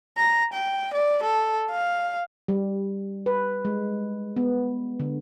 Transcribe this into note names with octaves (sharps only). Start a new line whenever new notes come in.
A#5
G5
D5
A4
F5
G3
B4
G#3
B3
D3